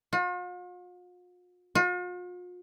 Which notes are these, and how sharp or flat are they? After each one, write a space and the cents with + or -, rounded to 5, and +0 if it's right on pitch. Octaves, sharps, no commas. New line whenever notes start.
F4 +45
F4 +45